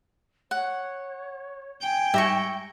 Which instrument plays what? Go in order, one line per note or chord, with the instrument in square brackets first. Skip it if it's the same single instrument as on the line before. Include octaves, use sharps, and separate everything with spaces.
[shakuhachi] C#5 [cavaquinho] F#5
[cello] G5 [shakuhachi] G#5
[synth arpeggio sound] G#2 G3 G4 [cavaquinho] E5 A#5 C#6